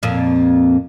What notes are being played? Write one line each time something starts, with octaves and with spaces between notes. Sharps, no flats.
F2 A#2